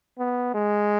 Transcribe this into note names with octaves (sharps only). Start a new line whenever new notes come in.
B3
G#3